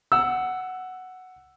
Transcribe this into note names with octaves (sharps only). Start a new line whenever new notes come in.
F#5 E6